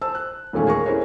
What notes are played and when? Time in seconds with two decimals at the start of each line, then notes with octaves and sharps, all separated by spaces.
0.02 C5 A5 E6
0.15 F#6
0.53 E1 D#2 A#2 A3 C#4
0.67 G#4 A#4 C#6
0.86 C#4 E4 G#4 A#4 C5 C#5